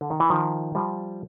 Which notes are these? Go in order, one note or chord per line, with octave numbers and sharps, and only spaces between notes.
D3
D#3
E3
D#3 F3
F3 G3